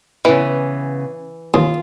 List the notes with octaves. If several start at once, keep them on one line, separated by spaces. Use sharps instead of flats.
C#3 E3 B3
D#2 F4